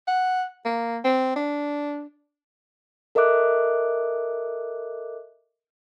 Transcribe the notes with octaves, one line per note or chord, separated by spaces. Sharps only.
F#5
A#3
C4
D4
A4 A#4 D#5 E5 D6 F#6